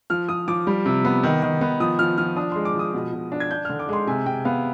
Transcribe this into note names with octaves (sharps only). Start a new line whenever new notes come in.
F3 F6
F3 D#6
F3 D6
G3
C3
B3
D#3
D#3
B3
F3 D#6
F3 F6
F3 F6
D4 D#6
G#3 C6
D6
F3
D#6
B2
B2
D4
G#6
D4 G6
D3 F6
D6
G#3 C6
C3 G#5
C3 G5
B3 F5